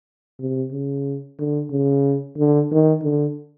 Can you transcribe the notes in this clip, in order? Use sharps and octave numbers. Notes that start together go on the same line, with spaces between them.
C3
C#3
D3
C#3
D3
D#3
D3